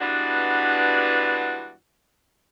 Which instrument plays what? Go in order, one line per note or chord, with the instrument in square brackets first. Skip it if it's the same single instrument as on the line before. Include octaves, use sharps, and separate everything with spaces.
[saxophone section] G2 E3 G#3 B3 D4 F#4